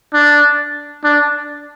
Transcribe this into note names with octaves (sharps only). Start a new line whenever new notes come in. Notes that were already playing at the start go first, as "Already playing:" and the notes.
D4
D4